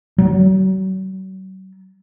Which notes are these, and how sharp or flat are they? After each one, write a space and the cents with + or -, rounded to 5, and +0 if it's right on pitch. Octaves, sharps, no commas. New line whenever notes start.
F#3 +40